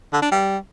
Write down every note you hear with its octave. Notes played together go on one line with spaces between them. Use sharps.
D3
D4
G3